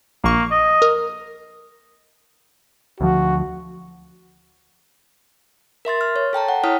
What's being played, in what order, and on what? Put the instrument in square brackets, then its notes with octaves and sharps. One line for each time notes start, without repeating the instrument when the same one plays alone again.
[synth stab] A#1 C#6 [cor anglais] A#3
[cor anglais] D#5
[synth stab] A#4
[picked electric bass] D2 F3 [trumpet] F#4
[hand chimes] A#4 E5 C6 A6
F6
C#5
A4 G5 A5 A#5
F#5
E4 C#5 G5 D#6 F6 B6